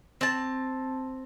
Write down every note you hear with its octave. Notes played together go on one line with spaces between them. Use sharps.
C4 A5